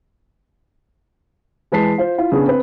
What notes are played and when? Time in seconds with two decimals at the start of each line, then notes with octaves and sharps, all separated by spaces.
1.72 E3 G#3 B4 A5 B6 C7
1.98 F4 C5
2.18 E4 F4
2.32 C#3 B3 D4 G#4
2.47 C4 B4